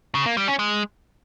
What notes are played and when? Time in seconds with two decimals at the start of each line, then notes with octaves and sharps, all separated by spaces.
0.15 C#3
0.26 A#3
0.37 G3
0.48 C#4
0.59 G#3